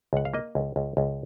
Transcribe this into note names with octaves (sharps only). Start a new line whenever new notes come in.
C#2 F#5
F5
A#3 D#5
C#2
C#2
C#2